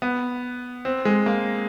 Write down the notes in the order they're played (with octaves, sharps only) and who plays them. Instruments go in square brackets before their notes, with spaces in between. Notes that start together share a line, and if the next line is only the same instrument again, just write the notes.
[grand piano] B3
C4
G#3
A#3